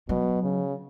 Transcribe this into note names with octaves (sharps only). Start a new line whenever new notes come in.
B2 F#3
C#3